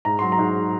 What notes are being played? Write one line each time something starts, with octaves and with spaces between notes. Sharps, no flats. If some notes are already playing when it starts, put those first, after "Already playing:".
G#2 A#5
F#3 C6
A#5
G#2